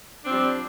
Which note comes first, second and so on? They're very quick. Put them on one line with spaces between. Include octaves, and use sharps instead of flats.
D4 C4 F3 G3